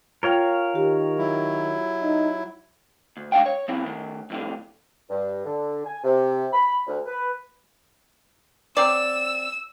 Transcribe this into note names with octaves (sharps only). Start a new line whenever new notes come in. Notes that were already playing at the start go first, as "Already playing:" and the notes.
F4 A#4 C#5 F5 G5
D#3 G4
F#3 E4
D#4
D2
G#3 D4 F5 G5
C#5
F3 C4 E4
D#3 A3
F2 A2 D3
G2
D3
G#5
C3
B5
D2
B4
F#3 C4 D5 E6